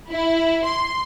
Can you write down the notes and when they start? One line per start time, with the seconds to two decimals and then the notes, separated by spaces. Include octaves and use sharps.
0.10 E4
0.64 C6